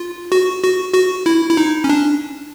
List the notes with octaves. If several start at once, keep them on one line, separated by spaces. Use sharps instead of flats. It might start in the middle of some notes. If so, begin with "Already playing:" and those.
Already playing: F4
F#4
F#4
F#4
E4
E4
D#4
C#4
D4